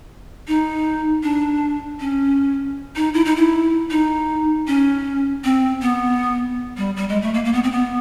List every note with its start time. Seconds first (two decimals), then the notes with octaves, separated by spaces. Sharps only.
0.48 D#4
1.23 D4
2.00 C#4
2.96 D#4
3.14 E4
3.25 D#4
3.36 E4
3.91 D#4
4.67 C#4
5.44 C4
5.82 B3
6.77 G3
6.97 G3
7.09 G#3
7.22 A3
7.34 A#3
7.45 A#3
7.53 B3
7.64 C4
7.72 B3